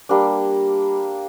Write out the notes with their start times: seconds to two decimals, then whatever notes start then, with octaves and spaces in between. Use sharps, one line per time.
0.09 G3 A#3 D4